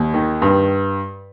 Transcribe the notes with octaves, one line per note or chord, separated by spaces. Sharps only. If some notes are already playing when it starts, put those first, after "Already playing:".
Already playing: D#2
D#3
G2